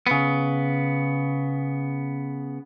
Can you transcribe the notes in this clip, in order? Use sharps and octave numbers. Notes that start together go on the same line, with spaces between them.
C#3 B3